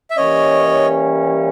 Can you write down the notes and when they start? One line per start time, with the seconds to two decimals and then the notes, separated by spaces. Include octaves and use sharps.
0.10 E5
0.16 E3 G3 A#3 C#4 C#5 D#5